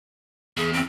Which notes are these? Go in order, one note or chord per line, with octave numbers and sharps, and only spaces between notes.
E2 G#4
C4